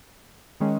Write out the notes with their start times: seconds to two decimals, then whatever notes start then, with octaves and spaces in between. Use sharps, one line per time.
0.60 D#3 G#3 C#4